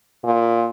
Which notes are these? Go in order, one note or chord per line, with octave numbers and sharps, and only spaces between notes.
A#2